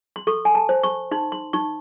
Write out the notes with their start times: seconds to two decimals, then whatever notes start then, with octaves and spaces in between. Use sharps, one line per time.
0.16 C6
0.27 A4 C#6
0.45 G#5
0.55 A5
0.69 C5
0.83 C#6
1.11 D#4 C6
1.32 C6
1.53 D#4 C#6